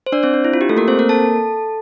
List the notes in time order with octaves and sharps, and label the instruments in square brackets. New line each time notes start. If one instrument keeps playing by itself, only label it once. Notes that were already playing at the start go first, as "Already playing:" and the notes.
[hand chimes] C5
D4 D5
C4 C5
D4
E4
F4
G4
A3 A4
A#3 A#4
C4 C5
A#3 A#4
A4 A5